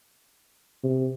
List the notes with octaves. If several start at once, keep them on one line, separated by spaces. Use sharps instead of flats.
C3